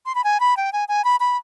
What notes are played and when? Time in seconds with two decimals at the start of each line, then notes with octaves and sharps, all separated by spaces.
0.06 C6
0.15 B5
0.24 G#5
0.40 B5
0.57 G5
0.73 G#5
0.88 G#5
1.04 B5
1.20 B5